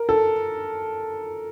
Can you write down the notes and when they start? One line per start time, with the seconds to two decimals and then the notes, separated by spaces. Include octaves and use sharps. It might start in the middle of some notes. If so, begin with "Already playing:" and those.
Already playing: A#4
0.09 A4